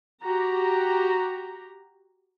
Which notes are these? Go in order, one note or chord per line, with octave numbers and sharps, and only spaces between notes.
F#4 G4 A#5